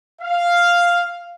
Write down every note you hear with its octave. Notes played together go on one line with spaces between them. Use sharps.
F5